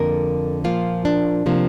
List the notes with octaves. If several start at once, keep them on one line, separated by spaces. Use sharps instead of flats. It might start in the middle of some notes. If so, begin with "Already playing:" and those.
Already playing: F2 D3 A#3 A#4
A#2 F3 A#3 F4
D4
C3 F3 A#3